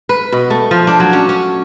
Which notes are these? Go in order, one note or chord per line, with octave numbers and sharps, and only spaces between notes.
B4
B2
A3
F3
D4
F#3
C#4
C#4